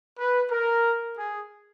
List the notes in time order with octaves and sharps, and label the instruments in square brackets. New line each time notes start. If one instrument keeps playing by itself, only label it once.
[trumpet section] B4
A#4
G#4